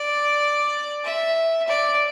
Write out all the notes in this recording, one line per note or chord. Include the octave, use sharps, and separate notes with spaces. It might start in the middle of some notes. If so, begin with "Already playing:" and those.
Already playing: D5
E5
D5